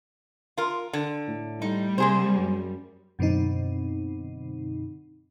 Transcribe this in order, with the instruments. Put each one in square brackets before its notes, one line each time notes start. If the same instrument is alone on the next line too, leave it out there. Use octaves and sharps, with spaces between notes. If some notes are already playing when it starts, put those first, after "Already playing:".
[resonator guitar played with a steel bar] F4 A#4
D3
[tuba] A2
[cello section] G3 [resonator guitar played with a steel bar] D#4
[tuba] C3 [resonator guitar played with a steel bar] A#3 G#4 C5
[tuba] F#2
[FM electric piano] F#2 B2 D3 C4 D#4